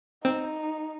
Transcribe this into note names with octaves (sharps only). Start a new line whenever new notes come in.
C4 D#4